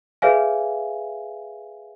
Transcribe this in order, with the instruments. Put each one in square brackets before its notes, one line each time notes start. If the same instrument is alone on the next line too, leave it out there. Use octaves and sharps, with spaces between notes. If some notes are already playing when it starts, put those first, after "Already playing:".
[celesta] G#4 B4 C#5 E5 F5 G#5